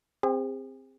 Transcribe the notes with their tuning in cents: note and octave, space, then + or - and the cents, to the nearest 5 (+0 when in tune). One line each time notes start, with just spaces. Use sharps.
C4 +0 G#4 -40